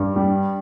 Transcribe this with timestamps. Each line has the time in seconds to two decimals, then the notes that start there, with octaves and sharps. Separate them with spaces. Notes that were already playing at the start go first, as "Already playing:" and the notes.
Already playing: G2
0.16 G3